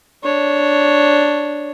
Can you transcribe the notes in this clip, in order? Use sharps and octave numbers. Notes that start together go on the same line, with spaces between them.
D4 C#5